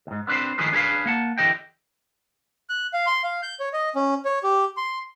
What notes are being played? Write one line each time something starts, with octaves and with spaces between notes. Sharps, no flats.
D#2 G#2
B3 C4 D4 B4 C5
D#3 F3 A3 G#4 B4 C5
D4 G#4 A4 B4 F5
A#3 F#5 A5
D3 E3 G4 D#5 G5
F#6
F5
C6
F5
G6
C#5
D#5
C#4
C#5
G4
C6